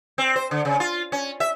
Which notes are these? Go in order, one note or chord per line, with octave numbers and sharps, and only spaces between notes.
C4
C5
D3
C#3
F4
C#4
E5